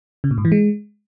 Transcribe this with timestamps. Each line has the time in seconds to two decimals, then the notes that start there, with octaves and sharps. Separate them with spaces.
0.24 C#3
0.31 A#2
0.38 G#2
0.45 E3
0.52 G#3